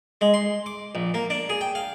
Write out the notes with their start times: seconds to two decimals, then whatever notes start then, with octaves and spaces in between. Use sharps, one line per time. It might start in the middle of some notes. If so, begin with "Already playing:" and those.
0.21 G#3
0.34 C6
0.66 D6
0.95 A#1
1.14 A#3
1.30 D4
1.49 G#4
1.61 G5
1.75 F5